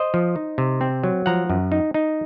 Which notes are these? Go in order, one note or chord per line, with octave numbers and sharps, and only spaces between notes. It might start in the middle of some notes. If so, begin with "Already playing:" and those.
Already playing: C5 D#5
F3
D#4
C3
C4
F#3
F3 F#5 A#5
F#2
D#4
D#4